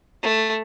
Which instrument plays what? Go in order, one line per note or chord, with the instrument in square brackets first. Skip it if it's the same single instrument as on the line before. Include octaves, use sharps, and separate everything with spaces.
[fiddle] A3